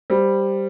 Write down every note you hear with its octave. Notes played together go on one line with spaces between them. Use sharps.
G3 C5